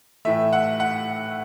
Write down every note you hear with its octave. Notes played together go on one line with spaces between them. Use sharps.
A2 E3 A3 E5
F#5
F#5